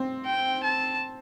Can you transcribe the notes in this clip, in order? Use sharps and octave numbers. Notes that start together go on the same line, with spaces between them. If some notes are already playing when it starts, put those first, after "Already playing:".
Already playing: C4
G5
A5